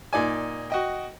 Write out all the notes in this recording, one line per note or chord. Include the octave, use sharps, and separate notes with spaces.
A#2 D#4 D5 G#5
F#4 D#5 G5